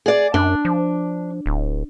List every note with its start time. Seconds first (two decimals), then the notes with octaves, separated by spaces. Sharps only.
0.06 G#4 D5
0.34 F#2 D4
0.65 F3
1.46 D1